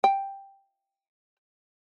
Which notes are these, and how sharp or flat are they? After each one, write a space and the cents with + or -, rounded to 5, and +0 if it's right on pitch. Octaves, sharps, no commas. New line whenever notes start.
G5 +5